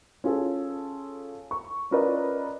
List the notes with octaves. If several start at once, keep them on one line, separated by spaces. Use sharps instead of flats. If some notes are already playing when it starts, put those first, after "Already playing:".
C#4 F4 G#4 A4
C#6
C#4 F4 A#4 B4 D5 D#5